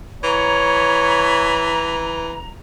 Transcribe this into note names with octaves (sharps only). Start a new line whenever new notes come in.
E3 C#5 A#5